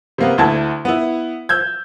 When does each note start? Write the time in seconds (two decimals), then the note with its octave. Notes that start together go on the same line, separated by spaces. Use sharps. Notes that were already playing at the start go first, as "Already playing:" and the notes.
0.18 C3 A#3 B3
0.38 D2 E4 A5 G#6
0.85 B3 E4
1.49 E6 G6 G#6